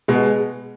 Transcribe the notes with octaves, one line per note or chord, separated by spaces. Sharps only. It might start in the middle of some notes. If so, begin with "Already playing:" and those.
B2 G#3